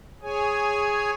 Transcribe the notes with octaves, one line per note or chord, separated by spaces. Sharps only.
G#4 C#5 G#5